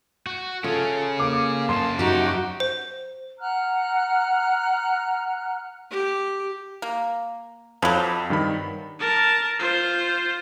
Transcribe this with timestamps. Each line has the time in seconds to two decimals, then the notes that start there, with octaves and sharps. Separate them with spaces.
0.26 F#4
0.64 C#4 F4 G#4 A4
1.20 A#3 D6
1.69 F#2 A5 C6
1.99 D#4 F#4 G4
2.60 C5
3.39 F#5 A#5 F6 F#6
5.90 G4
6.82 A#3
7.82 F2 F3 F#3 B5
8.30 G2 D#3 B5
9.00 A#4 A5
9.59 F4 C5